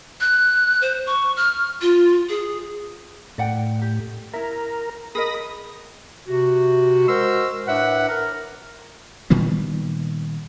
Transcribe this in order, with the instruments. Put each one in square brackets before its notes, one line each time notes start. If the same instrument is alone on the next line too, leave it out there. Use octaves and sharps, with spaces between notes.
[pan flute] F#6
C5
C#6
F6
F4
G#4
[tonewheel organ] A2 [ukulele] D5 F#5 G5
[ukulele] G4
[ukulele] E4 E5 [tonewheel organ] A#4
[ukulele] G#4 A#4 D#5 [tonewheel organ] B5 D#6 A#6
[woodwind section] C3 F#4
G#3 F#4 A#4 C5 C6 E6
A2 D4 B4 E5 F#5
A#4
[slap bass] A#2 D#3 G3 B3